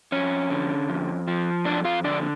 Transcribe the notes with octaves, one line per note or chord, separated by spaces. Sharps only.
F2 C#4 C#5
D3
F2
F3
F2 D4 D5
F4 F5
D3 D4 D5